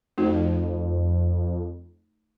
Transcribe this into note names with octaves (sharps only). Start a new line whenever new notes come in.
F2 A3 D#4 F#4